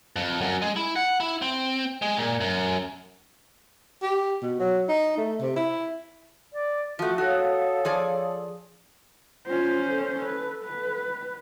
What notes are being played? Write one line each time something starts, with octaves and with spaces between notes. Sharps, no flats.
F2
F#2
G#3
E4
F#5
E4
C4
G#3
A#2
F#2
G4
B2
F#3
D#4
A3
C3
E4
D5
F3 A3 F#4
F#4 A4 C#5 F5 D#6
F3 G#4 D5
C#4 F4 C5
A4
B4
B4